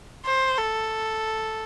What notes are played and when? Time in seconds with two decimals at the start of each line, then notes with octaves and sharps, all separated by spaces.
0.26 C5
0.58 A4